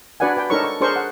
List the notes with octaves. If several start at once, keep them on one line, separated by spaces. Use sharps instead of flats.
D4 F#4 B4 D5 F#5 G#5
B4 G5
D4 D#4 A4 A#4 C#5 C#6
C#6
D4 G#4 A#4 C5 C#6
F#5